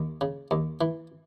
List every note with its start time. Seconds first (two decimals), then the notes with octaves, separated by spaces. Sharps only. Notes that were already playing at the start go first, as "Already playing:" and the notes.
Already playing: D#2
0.21 C#3
0.51 D#2
0.81 E3